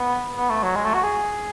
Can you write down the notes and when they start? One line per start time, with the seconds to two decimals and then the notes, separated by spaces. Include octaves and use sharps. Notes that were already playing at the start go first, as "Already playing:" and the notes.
Already playing: B3
0.37 B3
0.50 A3
0.63 F#3
0.76 G#3
0.85 A3
0.94 F#4
1.04 G#4